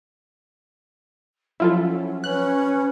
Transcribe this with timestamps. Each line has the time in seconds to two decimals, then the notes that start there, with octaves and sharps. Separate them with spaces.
1.60 F3 F#3 C#4 E4 F4 A4 E5
2.24 C#4 B4 F#6